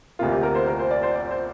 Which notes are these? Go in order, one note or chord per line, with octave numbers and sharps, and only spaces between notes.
D2 C3 A#3 F4
G4
A#4
C5
A#4
C5
D5
C5
D5
C5